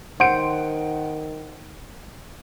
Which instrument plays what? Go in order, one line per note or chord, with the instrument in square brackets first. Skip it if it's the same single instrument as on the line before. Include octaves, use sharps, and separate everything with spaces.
[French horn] D#3 [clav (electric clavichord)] C5 [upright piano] F#5 C#7 D7